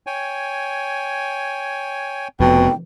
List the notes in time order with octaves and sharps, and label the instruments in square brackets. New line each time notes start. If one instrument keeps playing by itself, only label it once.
[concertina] C#5 G5 G#5
[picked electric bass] F1 F2 [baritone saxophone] B2 [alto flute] G5